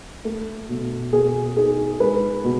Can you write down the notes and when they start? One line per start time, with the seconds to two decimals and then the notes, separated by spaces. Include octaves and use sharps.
0.25 A3 A4
0.69 B2
1.12 B2 G#4
1.57 D#4 G#4
2.00 G#3 B4
2.44 B2